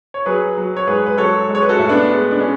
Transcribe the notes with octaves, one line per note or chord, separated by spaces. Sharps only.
C#5
F#3 G#4 B4
F#3
C#5
G#2 G#4 B4
B4
F#3 A4 C#5
G#3
C#5
B4
F#4 A4
A2 E4
B3 D4
G#3 B3
D4
G#3 C#4